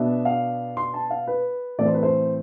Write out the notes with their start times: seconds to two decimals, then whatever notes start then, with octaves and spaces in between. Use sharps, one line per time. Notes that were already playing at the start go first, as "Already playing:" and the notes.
Already playing: B2 B3 D4 E5
0.25 F5
0.77 C6
0.94 A5
1.10 F5
1.27 B4
1.78 A2 E3 A3 C4 D5
1.86 C5
1.94 B4
2.03 C5